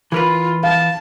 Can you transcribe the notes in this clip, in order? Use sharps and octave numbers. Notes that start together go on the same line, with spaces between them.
E3 F4 A#4 B4
F5 A5